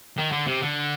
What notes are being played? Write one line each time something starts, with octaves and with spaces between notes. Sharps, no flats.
D#3
D3
C3
D3